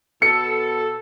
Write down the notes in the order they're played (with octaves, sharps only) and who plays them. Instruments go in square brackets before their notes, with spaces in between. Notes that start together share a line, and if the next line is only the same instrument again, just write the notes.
[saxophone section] B2 A4 [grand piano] C#7